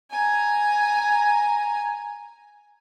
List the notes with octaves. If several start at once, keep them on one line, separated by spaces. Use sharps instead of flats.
G#5 A#5